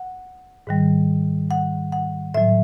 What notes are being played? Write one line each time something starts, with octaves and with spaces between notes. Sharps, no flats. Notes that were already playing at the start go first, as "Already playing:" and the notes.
Already playing: F#5
G#2 D#3 G3
F#5
F#5
A2 F#3 E5